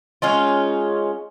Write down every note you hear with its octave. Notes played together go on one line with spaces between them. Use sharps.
G#3 C#4 D#4 F4